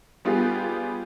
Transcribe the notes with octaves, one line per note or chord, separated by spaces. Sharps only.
G3 B3 F4 G4 G#4